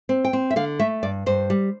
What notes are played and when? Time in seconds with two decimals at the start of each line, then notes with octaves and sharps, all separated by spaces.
0.09 C4
0.25 G5
0.33 C4
0.50 E5
0.56 D3 F5
0.79 A3 E5
1.03 G2 D5
1.26 G2 C5
1.50 G3